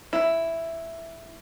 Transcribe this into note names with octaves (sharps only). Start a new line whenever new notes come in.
E4